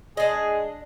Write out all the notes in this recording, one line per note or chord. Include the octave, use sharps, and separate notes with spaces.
G#3 D4 G#4 D#5